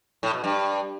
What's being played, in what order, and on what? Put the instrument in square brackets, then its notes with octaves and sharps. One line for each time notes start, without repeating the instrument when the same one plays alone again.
[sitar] A2
B2
G2